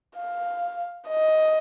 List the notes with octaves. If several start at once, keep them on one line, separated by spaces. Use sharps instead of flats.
F5
D#5